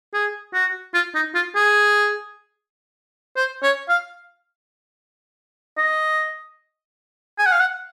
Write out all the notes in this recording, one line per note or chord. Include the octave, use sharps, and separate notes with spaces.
G#4
F#4
F4
D#4
F4
G#4
C5
C#5
F5
D#5
G#5
F#5
F5
F#5